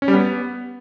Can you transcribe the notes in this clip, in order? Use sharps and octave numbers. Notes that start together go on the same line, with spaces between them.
C#4
G3
B3